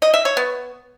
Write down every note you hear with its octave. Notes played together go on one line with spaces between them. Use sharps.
D#5
E5
C#5
B3